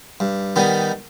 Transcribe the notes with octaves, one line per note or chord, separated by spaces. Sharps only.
G2
D#3 G3 B3 D#4